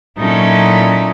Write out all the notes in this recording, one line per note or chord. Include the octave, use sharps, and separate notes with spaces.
A#2 F#3 C#4 D#4 E4 A4